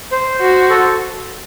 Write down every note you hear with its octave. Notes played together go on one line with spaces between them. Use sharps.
C5
F#4
A4